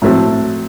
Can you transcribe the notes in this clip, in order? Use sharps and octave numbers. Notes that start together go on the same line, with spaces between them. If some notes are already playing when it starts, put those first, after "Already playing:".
A2 F#3 A3 C4